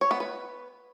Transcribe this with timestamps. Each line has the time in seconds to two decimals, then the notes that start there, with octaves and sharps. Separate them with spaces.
0.01 C#5
0.11 B3
0.20 B4